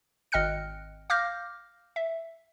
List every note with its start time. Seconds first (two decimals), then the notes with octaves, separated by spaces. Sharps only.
0.32 G#1 D#5 G5 F6 F#6 C#7
1.10 F5 D6 F6 G6 A#6
1.96 E5